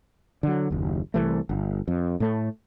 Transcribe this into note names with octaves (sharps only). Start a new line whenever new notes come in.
D3 F#3
F#1 D#2
C2 E3 A3
G1
F2
A2 A3